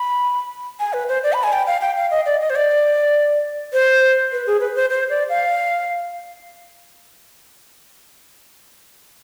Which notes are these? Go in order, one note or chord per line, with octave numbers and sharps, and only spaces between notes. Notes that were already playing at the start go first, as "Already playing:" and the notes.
Already playing: B5
G#5
B4
C5
D5
B5
G#5
G5
F5
G5
F5
D#5
D5
D#5
C5
D5
C5
B4
G#4
B4
C5
C5
D5
F5